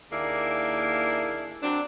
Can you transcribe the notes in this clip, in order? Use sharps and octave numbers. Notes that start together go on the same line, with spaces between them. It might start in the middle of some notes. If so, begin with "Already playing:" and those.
D#2 A#3 D4 E4 G#4
F#3 C4 D4